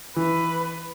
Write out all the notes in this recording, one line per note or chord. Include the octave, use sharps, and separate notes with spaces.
E3 B4